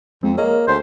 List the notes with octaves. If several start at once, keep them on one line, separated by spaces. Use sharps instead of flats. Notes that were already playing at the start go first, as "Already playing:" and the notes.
F2 G#3 C4
A#3 G#4 C#5 D#5
D2 C5